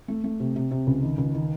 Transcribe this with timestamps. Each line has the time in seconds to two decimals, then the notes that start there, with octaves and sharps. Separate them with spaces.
0.08 A3
0.24 A3
0.40 C3
0.56 C3
0.71 C3
0.87 C#2
1.03 D#3
1.18 C#2
1.34 D#3